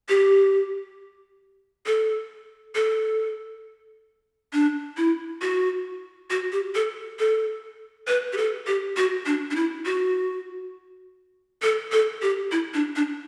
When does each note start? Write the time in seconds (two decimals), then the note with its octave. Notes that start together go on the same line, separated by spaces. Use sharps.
0.09 G4
1.86 A4
2.75 A4
4.53 D4
4.97 E4
5.42 F#4
6.30 F#4
6.52 G4
6.75 A4
7.19 A4
8.07 B4
8.33 G4
8.37 A4
8.67 G4
8.97 F#4
9.26 D4
9.51 D4
9.56 E4
9.85 F#4
11.62 A4
11.92 A4
12.22 G4
12.52 E4
12.74 D4
12.96 D4